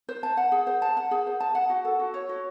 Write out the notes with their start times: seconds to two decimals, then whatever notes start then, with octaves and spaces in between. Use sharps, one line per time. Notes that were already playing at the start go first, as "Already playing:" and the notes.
0.09 C5
0.23 A5
0.37 F#5
0.52 G#4
0.67 C5
0.82 A5
0.97 F#5
1.11 G#4
1.26 C5
1.40 A5
1.55 F#5
1.70 F#4
1.85 A4
1.99 F#4
2.14 C#5
2.29 F#4